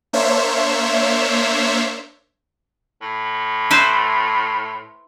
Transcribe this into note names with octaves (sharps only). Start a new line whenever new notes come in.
A#3 D4 C5 C#5 E5
A2
E4 B4 C5